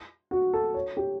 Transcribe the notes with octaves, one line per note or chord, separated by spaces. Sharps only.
F#4
A4
C#5
G4